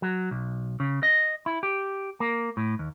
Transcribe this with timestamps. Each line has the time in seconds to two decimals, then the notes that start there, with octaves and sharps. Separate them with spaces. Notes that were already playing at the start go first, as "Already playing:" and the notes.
0.02 F#3
0.31 B1
0.80 C#3
1.03 D#5
1.46 E4
1.63 G4
2.20 A#3
2.57 A2
2.79 D#2